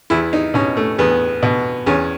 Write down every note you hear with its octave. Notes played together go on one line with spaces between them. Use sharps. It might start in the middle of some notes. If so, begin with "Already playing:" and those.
E2 E4
D#4
B2 C#4
A3
E2 B3
B2
E2 C#4